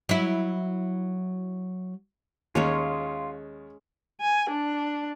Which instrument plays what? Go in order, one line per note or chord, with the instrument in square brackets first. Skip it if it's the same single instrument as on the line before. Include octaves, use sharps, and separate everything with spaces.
[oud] F#3 E4
[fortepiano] D#2 [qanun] G#3 C#4 C#5 [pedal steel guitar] F4
[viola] G#5
D4